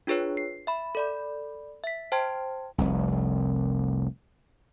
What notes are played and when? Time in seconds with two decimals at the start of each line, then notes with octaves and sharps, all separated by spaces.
0.07 D4 F4 G#4 B4 C#5
0.37 C7
0.67 E5 B5
0.95 A4 D5 B5
1.84 E5 B6
2.12 C5 G5 A5 C6 G#6
2.78 F1 C2